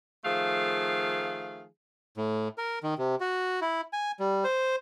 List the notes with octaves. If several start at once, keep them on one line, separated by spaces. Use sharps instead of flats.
D#3 F3 A3 G#4 F5
A2
A#4
D#3
C3
F#4
E4
G#5
G3
C5